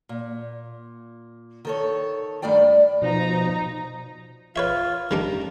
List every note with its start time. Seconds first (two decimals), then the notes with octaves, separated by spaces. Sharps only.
0.09 A#2
1.65 D#3 A4 C#5
2.42 G2 D#3 A3 D5 G5
3.02 B2 F3 D#4 A#5
4.56 F4 B4 C#5 E5
5.11 D#3 G3 D4 A#5